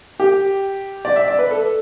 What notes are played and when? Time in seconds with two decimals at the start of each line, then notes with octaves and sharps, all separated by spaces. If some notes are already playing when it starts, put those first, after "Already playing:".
0.20 G4
1.05 D5
1.16 E5
1.28 D5
1.39 B4
1.51 A4